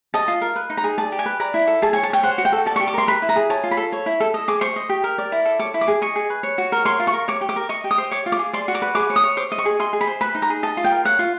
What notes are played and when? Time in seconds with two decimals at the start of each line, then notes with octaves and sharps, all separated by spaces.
0.14 D#5 A5
0.28 F4
0.42 A#4
0.56 B4
0.70 D#4
0.77 A#5
0.84 G#4
0.98 D5 A5
1.12 G4
1.19 G#5
1.26 B4
1.40 D5 A#5
1.54 E4
1.67 A4
1.82 G#4 A5
1.93 G#5
1.96 C#5
2.03 A5
2.10 C#5 G5
2.23 C5 F#5
2.38 F#4
2.45 G5
2.52 A4
2.66 D5 A5
2.76 C#6
2.80 G4
2.88 D6
2.94 A#4 C6
3.08 B4 B5
3.22 E4
3.29 A#5
3.36 G#4
3.50 C#5 A5
3.64 F4
3.71 B5
3.77 A4
3.92 C#5
4.06 E4
4.20 A4
4.34 D#5
4.48 G#4 D6
4.61 C5 C#6
4.76 D#5
4.89 G4
5.04 A#4
5.18 D5
5.32 E4
5.45 A4
5.60 C#5 D6
5.74 E4
5.81 D6
5.88 G#4
6.02 D#5 C#6
6.16 G#4
6.30 B4
6.43 C#5
6.58 F#4
6.72 A#4
6.85 C#5 C6
7.00 F4
7.07 C#6
7.13 A#4
7.28 C#5 D6
7.41 G4
7.49 D6
7.56 A#4
7.69 D#5 C#6
7.84 G4
7.91 D#6
7.98 C5
8.11 C#5 D6
8.26 F4
8.32 D6
8.39 G#4
8.53 D5 C6
8.68 F#4
8.75 D6
8.82 B4
8.95 G#4 D6
9.10 C#5
9.16 D#6
9.24 C#5
9.37 C5 D6
9.52 D#5
9.58 C#6
9.65 G#4
9.80 D#5 C6
9.93 G#4
10.01 B5
10.07 C5
10.21 B4 B5
10.35 D#4
10.42 A#5
10.50 G#4
10.63 D#5 A5
10.77 F4
10.84 G5
10.91 A#4
11.05 C#5 F#5
11.19 F4